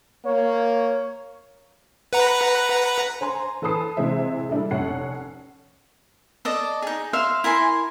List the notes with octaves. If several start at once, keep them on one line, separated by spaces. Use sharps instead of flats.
A#3 C#5
B4 F#5 A#5
C5 G#5 A#5 C6
E3 A4 B4 A5 D#6 C7
C3 E3 G#3 C5 E5
G3 D4 E4 A4
F1 C#4 F#5 C7
A4 D5 D#5
D#4 G#4
E5 F5 C6
E4 A#4 G#5 C6